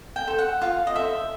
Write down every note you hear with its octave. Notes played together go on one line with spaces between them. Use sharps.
G5
A4 C5
F#5
F4 F5
D#5
A4 C5 E5